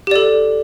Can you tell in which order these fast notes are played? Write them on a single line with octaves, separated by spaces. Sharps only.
G4 D5 A4